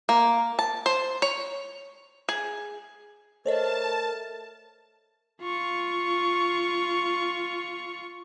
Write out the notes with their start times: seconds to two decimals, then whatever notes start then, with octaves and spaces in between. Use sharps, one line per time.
0.09 A#3
0.59 A5
0.86 C5
1.22 C#5
2.29 G#4
3.46 A3 A#4 C5 C#5 D#5 A5
5.42 F4 C#6